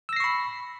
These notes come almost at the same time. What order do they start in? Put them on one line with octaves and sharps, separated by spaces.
E6 A#6 C7 C#6 B5